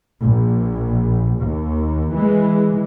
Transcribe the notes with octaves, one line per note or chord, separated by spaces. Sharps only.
A#1
D#2
E3 G#3